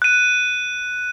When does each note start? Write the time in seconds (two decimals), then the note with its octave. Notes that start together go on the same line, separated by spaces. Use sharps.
0.02 F#6 D#7